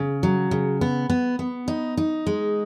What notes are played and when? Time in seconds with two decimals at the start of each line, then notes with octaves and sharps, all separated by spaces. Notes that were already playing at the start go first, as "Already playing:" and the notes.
Already playing: C#3
0.23 F#3
0.51 C#3
0.81 B3
1.10 B3
1.39 B3
1.68 D#4
1.97 D#4
2.27 G#3